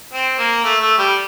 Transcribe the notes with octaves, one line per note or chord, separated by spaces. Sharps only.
C4
A#3
A3
A3
G3